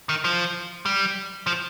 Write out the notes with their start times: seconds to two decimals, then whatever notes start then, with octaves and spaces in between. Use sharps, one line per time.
0.09 D#3
0.24 F3
0.86 G3
1.47 F3